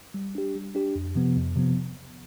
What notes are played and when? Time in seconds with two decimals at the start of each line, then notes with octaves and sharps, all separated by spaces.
0.14 G3
0.35 D4 G4
0.55 G3
0.75 D4 G4
0.96 F2
1.15 C3 F3 B3
1.36 F2
1.56 C3 F3 B3